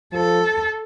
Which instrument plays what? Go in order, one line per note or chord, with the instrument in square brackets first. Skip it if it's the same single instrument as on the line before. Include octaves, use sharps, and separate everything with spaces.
[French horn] F3 [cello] A4